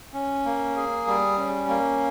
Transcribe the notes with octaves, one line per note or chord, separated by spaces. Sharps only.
C#4
A#3
G#4
G3
C#4
A#3